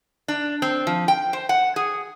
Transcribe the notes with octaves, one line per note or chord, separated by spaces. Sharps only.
D4
C4
F3
G5
C5
F#5
G#4